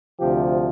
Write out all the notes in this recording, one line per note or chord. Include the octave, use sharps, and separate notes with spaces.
D2 C3 F3 G4